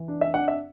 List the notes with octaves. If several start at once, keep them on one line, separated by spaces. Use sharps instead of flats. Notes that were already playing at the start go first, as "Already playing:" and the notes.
Already playing: E3
D4
E5
D4 F#5
E5